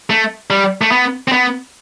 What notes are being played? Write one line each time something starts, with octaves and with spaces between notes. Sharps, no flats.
A3
G3
A3
B3
C4
B3